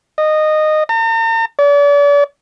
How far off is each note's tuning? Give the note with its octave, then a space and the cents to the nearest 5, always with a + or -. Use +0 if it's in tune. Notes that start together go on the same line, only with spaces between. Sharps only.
D#5 -15
A#5 -45
D5 -40